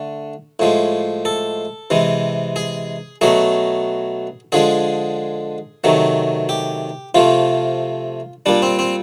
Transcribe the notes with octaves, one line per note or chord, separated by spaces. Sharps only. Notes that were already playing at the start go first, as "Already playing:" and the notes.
Already playing: D3 A3
A2 F3 G#3
A4
C3 E3 G#3
G#4
B2 F#3 A3 G#4
D3 F3 G#3 G#4
C3 D#3 F#3 A3
G4
C3 F3 A3 F4
A#2 G3 D4
C4
C4